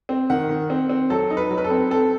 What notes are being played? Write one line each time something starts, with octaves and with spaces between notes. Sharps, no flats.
C4
D#3 F#5
D#3
C4
C4
F#3 A4
D#4
B4
F#3
B4
A4
C4
C4 A4